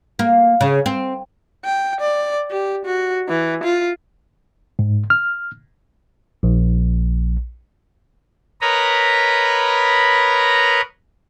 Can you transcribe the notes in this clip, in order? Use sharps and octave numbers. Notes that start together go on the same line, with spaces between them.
A#3
C#3
C4
G5
D5
G4
F#4
E3
F4
G#2
F6
A#1
A#4 B4 C#5 D#5 A#5 B5